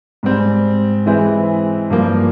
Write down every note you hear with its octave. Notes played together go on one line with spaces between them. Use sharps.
G#2 G3 C4
E3 G#3 C4 E4
G2 F3 A#3